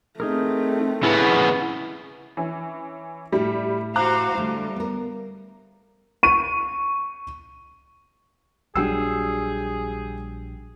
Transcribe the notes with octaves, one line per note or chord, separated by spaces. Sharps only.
A3 C4 D#4 G#4 A#4
C#3 B3 E4
E3 C#4
A2 G3 E4
F#4 C5 F5 A#5 D6 F#6
D3 G3 A3
B3 A#4
C#6 D#7
A#1 F#3 G3 D4 G#4 G5 E6 C7